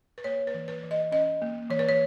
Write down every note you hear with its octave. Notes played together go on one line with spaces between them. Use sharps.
B4
A#3 C#5
B4
E3
B4
E3
D#5
C#4 D#5
A#3
E3 C#5
B4
C#5